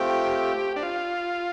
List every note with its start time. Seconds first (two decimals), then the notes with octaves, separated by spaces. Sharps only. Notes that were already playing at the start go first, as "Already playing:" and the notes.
Already playing: A3 C4 F4 G4
0.76 D4
0.83 F4